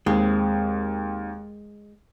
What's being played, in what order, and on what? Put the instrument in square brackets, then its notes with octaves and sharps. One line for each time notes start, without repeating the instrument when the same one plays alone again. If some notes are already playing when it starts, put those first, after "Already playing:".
[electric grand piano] D#2 C4 [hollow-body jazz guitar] G#3